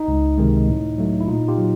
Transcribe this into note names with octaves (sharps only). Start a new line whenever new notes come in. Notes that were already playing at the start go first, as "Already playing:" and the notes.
Already playing: D#4
C#2
C3 D#3 G#3
A2
F#3 A3
E4
A#2 D#4 F4
F4 G4
F#3